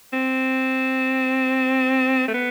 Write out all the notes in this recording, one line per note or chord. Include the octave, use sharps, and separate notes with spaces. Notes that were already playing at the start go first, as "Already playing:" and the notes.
C4
A3
B3